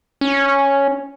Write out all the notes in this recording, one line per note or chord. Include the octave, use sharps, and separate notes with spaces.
C#4